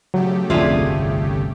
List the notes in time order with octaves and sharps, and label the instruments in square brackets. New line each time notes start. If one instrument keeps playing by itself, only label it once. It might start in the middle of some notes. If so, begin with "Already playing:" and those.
[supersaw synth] C#3 A3 G4 [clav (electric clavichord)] F#3
[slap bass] G1 C2 [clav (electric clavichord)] F2 D4 [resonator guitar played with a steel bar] F4 G#4 E5